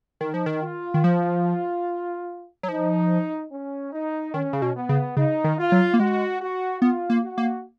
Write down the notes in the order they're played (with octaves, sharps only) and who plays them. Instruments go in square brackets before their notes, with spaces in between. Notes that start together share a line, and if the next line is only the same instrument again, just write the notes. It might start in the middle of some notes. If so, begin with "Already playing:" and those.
[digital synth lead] D#3 [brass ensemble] D#4
[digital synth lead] F3
D#3
[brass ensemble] F4
[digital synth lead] D#3
F3
F#3
[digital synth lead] F3 [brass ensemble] D#4
[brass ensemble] C#4
D#4
[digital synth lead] D#3 [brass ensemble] C#4
[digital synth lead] C#3
B2
[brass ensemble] B3
[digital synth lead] C#3
[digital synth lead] C#3 [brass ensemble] D#4
[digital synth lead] D#3
[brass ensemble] F4
[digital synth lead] F#3
A#3
[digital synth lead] G#3 [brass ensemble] F#4
[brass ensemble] F#4
[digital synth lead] B3 [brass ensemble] F4
[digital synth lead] A#3
[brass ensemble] F#4
[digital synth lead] A#3